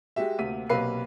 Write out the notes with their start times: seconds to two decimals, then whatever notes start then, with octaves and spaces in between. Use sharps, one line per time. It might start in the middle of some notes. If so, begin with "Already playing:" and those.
0.16 G#3 F#4 G4 E5
0.39 D2 C3 A#3 B6 D#7
0.70 B1 C3 A#3 B4 F5 C7